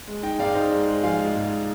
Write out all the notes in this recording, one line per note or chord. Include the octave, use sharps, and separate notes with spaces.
G#3
D#4 D#5 G5
G#2 D5 F5
D#4 C5 D#5
G#3
G#3
F3 F5 G#5
G#3
G#2